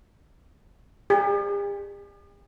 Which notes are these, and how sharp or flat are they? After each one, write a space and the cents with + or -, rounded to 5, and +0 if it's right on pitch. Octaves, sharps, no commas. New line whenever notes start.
G4 +45